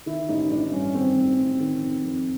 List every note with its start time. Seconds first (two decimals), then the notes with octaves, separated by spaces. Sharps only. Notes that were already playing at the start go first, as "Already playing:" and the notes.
0.06 D#3 E4
0.29 A1 D#4
0.50 A1 D4
0.72 G2 C#4
0.95 D#3 C4
1.17 A1
1.39 A1
1.60 D#3
1.82 F2
2.04 F2